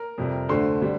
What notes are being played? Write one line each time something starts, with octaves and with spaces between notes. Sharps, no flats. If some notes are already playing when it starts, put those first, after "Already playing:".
Already playing: A#4 A#5
F2 C3 G3
D2 D3 A3 C5 C6
D3 G3